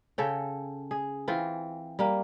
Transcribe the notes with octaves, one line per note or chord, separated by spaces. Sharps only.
C#3 A4 C#5 G5
G#4
E3 C4 F4
G3 A#3